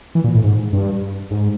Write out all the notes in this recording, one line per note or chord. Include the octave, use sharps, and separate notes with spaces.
E3
A#2
A2
G#2
G2
G#2